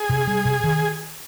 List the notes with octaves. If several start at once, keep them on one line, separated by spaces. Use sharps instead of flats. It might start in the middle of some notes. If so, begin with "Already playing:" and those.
Already playing: G#4
C3
G3
C3
D#3